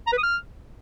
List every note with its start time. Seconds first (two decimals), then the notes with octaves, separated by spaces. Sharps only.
0.07 A#5
0.12 B4
0.18 D#6
0.23 F6